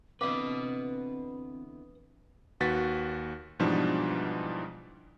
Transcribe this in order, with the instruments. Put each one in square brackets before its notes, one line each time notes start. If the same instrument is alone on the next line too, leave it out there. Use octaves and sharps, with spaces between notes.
[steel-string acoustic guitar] D3 E3 B3 [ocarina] C4 [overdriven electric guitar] B4 D#5 [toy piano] F5 D6
[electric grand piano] D#2 F#4 B4 A6 B6
G#2 B2 E3 F3 G3 D4